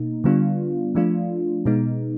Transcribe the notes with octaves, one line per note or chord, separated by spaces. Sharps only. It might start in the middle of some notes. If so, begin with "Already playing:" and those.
Already playing: B2 A#3 D#4
D3 G3 B3 D4 F4
F3 A3 D4 F4
B2 G#3 B3 D#4